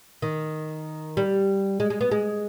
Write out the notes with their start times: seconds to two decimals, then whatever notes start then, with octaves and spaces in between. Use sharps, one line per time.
0.22 D#3
1.17 G3
1.80 G#3
1.90 G#3
2.01 B3
2.11 G#3